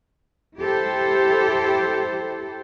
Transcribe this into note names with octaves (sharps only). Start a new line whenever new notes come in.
E4 G4 A4 C5